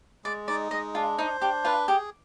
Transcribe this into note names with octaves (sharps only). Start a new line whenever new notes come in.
G#3 D5
D#4 D5
G#3 D#5
D4 F4
D#4 C5
D4 G4
F4 B4
G4 G#4